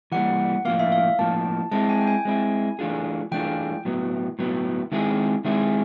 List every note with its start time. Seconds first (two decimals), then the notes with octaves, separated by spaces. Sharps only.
0.12 E3 G3 A#3 F#5
0.65 A2 F3 A#3 F5
0.79 E5
0.92 F5
1.19 A2 F3 A#3 A5
1.71 G#3 C4 E4 A5
1.89 G#5
2.01 G5
2.07 G#5
2.25 G#3 C4 E4
2.79 E3 A3 D4 F4 G#4
3.32 E3 A3 D4 F4 G#4 G5
3.85 A2 F#3 B3
4.39 A2 F#3 B3
4.92 D#3 G#3 C4 E4 G#4
5.45 D#3 G#3 C4 E4 G#4 E5